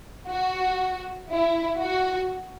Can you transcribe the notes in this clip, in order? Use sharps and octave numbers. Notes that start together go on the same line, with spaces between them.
F#4
E4
F#4